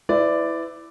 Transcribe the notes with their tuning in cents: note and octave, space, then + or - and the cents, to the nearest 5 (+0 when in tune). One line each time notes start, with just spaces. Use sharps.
E4 +0 B4 +35 D5 +0